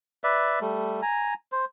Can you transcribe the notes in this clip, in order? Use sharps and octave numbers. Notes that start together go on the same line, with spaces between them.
B4 D5 E5
G3 A3
G#5 A#5
C5